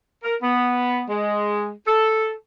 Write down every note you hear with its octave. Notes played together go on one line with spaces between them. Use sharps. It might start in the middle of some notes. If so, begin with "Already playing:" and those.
A#4
B3
G#3
A4